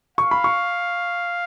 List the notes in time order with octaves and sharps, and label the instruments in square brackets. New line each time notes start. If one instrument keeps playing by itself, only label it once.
[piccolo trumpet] F5 [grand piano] C#6
[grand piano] B5
C#6